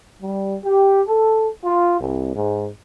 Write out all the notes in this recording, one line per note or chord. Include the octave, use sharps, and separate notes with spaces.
G3
G4
A4
F4
C2
G#2